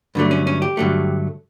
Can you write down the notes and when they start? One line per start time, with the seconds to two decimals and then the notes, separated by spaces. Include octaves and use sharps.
0.15 G2 D3 F#3 A3
0.31 C#4
0.47 C#4
0.62 G4
0.77 G2 D3 F#3 A3